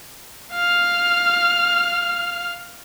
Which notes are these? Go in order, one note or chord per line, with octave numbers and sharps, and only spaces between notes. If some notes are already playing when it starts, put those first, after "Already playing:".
F5 F6